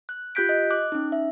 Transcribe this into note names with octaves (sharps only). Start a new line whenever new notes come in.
F#6
F4 G4 F#6 G6 B6 D7
D#5
D6 F#6
C#4 D#4
E5